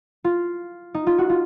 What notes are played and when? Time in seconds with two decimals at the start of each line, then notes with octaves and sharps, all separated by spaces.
0.24 F4
0.94 D#4
1.07 F4
1.18 F#4
1.29 F4